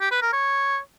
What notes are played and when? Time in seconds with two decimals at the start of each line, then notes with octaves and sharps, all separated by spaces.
0.01 G4
0.11 B4
0.22 A#4
0.33 C#5